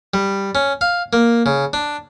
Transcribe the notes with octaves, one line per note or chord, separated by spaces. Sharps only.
G3
C#4
F5
A#3
C#3
D4